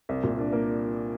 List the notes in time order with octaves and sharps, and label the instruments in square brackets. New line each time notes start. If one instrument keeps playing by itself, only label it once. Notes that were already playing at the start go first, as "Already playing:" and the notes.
[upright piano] C2
A#2
D4
A#3